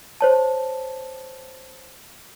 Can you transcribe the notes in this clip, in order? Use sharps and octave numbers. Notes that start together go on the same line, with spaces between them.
C5 C#5 A5